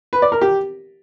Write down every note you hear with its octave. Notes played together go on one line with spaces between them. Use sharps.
B4
D5
A#4
G4